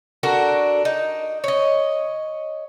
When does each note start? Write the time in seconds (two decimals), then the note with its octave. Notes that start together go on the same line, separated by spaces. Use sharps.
0.23 D4 F#4 A4 A#4
0.85 D#4
1.44 C#5 D#5